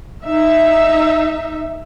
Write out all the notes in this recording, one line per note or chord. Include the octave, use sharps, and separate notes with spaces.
D#4 E5